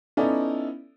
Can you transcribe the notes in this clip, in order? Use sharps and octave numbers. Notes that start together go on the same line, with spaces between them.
B3 C#4 D#4 E4 A4 D5